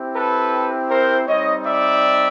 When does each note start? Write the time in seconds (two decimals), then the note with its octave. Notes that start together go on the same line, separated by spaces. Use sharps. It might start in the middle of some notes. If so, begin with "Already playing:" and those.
Already playing: C4 E4 G4
0.14 A4 B4
0.89 A#4 C5
1.27 G3 C4 D#4 C#5 D#5
1.64 D5 E5